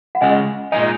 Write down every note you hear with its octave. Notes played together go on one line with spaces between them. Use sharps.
F#5
C#2 C#3 G#3 D#5 G#5
A#2 G#3 D#4 D#5 G#5